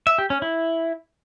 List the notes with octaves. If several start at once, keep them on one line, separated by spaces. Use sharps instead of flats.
E5
G4
C#4
E4